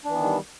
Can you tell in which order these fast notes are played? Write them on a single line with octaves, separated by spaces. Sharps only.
D4 E3 B3 D#3 G3